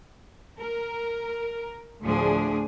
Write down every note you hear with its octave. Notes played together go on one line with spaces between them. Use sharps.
A#4
D2 A2 F3 D4 G#4